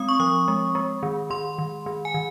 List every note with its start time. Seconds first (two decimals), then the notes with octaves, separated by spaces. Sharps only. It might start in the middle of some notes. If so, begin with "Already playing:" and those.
Already playing: G#3 C4 D#6
0.09 C#6
0.20 F3 D#6
0.48 G#3
0.75 G#3
1.03 D#3
1.30 D#3 C6
1.58 D#3
1.86 D#3
2.05 G#5
2.14 D#3